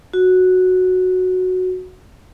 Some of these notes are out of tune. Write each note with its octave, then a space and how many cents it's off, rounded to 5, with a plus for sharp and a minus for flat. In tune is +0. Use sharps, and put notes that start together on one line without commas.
F#4 -5